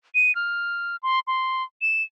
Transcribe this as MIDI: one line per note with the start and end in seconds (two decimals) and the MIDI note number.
0.15 0.34 99
0.35 0.96 89
1.03 1.20 84
1.27 1.63 84
1.82 2.03 100